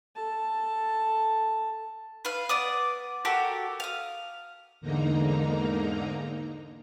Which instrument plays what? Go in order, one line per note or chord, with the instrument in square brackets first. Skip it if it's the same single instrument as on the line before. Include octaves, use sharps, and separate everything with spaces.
[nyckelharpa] A4 A5
[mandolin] B4 F5
B3 D5 D#6
F#4 G4 A4 A#4
F5 D#6
[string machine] E2 G#2 D3 A#3 D#4 A#5